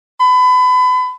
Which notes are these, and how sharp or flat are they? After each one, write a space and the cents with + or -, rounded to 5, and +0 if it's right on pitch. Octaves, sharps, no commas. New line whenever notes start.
B5 +30